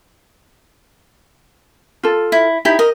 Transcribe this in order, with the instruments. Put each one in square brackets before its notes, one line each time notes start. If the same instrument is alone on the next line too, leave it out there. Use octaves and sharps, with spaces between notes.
[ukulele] F4 A4
[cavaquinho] E4
[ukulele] D#4 G4 G5 [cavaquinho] E4
[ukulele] A#4 [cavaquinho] D#5